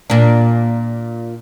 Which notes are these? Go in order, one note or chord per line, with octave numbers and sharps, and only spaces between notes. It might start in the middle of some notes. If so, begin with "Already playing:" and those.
A#2 D4